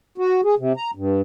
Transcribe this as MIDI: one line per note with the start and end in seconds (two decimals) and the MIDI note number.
0.18 0.41 66
0.44 0.55 68
0.58 0.73 48
0.76 0.91 82
0.95 1.21 43